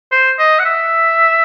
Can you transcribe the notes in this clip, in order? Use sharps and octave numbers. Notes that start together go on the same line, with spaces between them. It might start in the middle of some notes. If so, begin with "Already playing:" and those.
C5
D#5
F#5
E5